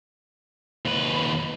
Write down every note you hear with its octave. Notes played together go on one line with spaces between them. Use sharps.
D#2 B4